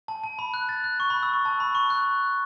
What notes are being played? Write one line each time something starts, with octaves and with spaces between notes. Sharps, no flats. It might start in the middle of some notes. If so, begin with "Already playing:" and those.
A5
A5
B5
F#6
A6
F#6
C#6
B5
E6
C#6
A5
B5
C#6
F#6